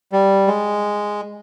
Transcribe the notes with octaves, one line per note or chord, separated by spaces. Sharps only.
G3
G#3